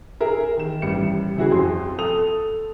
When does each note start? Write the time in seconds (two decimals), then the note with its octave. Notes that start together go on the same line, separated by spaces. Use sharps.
0.20 G#4 A#4 E5
0.57 D#3 E7
0.82 A1 G3 C#7
1.37 C#3 E4 F#4 G#4
1.52 F2 C6
1.98 A4 D#6 F7